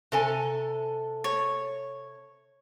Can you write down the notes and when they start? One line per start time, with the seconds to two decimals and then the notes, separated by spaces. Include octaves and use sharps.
0.12 C3 A4 G#5
1.24 C#5